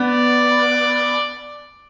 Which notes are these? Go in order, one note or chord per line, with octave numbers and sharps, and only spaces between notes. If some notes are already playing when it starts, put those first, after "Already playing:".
Already playing: B3 D5